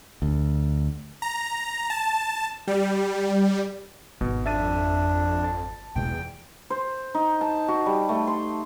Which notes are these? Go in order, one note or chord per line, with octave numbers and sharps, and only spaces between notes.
D2
A#5
A5
G3
G#1 B2
F2 D4 E5 A6 D#7
A5
E2 B2 G#3 G5
C5
D#4
A5
F#4
G3
A3
C6